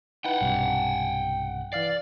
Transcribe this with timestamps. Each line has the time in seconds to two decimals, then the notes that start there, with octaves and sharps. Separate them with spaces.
0.24 D#4 E4 B4 F#5 G5
0.41 B1 G2 C3
1.73 E3 D5 F5 C7